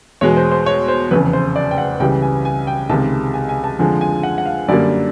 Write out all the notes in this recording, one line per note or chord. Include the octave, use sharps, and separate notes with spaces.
E2 B2 G#3 C#5
C5
C5
C#5
C5
F1 E2 C#3 B4
C5
D5
G5
F#5
C#2 C#3 E3 G3 G5
G#5
G#5
G5
C#2 C3 D#3 G#3 A5
G#5
G#5
A5
F2 D3 F3 G#3 G#5
G#5
F#5
F#5
F5
F#2 D3 G3 A#3 D5